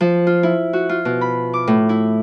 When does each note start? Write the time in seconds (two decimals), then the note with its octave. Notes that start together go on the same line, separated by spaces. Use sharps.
0.01 F3
0.27 F4
0.43 E4
0.73 F#4
0.89 F4
1.05 B2
1.21 B5
1.54 D6
1.67 A2
1.89 E4